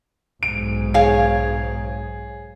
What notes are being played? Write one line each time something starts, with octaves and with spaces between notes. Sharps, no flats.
B1 G#2 D7
G#4 C#5 F5